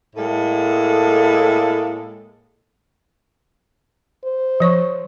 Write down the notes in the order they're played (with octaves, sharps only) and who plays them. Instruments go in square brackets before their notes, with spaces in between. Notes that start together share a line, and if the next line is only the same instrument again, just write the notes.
[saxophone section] A2 G#3 A#3 A4
[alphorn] C5
[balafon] F3 C#5 C#6